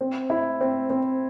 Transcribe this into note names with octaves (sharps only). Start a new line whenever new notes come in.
C4
E4
C4
C4